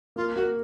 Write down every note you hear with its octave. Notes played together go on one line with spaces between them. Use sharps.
A#3 F4
A#3 F#4